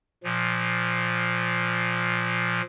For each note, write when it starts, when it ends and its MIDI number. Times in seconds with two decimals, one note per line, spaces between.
0.24 2.62 46
0.24 2.62 53